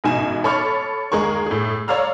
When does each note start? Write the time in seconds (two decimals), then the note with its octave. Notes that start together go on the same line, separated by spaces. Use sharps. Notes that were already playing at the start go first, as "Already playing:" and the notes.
0.04 A1 G#2 B2 G#5 E7
0.44 A4 C#5 B5 C#6 D6 F6
1.12 D#2 G#3 G#4 A#4 C#6
1.46 A2 G#4
1.88 C#5 D5 F5 A#5 E6 F6